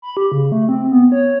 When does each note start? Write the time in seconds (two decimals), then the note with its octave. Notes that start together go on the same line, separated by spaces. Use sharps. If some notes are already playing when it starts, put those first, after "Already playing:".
0.02 B5
0.17 G4
0.32 C#3
0.52 A3
0.69 C4
0.91 B3
1.12 C#5